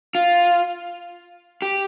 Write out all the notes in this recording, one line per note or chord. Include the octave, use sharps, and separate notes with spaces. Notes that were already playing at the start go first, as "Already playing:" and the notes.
F4
G4